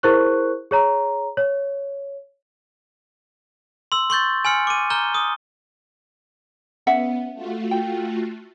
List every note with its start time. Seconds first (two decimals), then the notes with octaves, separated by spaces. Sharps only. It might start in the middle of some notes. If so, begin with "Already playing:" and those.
0.03 E4 G#4 A#4 C5 C#6 F#6
0.71 G#4 C#5 A#5
1.37 C#5
3.92 C6 E6
4.10 C6 C#6 G6 A6
4.45 G#5 C6 F6 C#7
4.67 D6 D#7
4.90 A#5 F6 G6 G7
5.14 D#6
6.87 B3 C#4 E5 F#5
7.34 A3 F4 F#4
7.71 G5